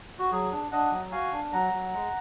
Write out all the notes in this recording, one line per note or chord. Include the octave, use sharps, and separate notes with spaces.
F#4
F#3 G#4
D4
D4 D#5 F#5
F#3
F#4 F5 G#5
D4
F#3 F#5 A#5
F#3
G#3